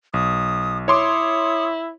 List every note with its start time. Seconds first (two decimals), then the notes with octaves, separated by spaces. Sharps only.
0.14 B1 D#6
0.88 E4 C#5 C6 D6 D#6